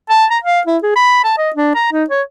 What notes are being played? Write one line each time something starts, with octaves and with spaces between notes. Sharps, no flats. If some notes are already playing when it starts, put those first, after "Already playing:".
A5
A#5
F5
E4
G#4
B5
A5
D#5
D4
A#5
D#4
C#5